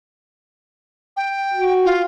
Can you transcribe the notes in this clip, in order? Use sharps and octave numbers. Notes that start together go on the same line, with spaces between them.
G5
F#4
F4